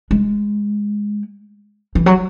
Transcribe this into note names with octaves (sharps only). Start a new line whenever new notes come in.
G#3
E3
F#3